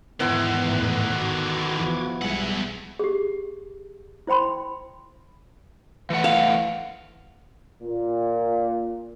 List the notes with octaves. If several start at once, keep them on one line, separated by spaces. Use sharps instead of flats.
E2 G#2 D3 D#3 B3 E4 C6
A2 B4
F#4 D6 G#6
E2 E3 F3
B1 E2 G3 G#3 E5 F#5 G#5
G4 G#4
E4 C5 G5 B5 C6
E3 A3 F#5
F5
A#2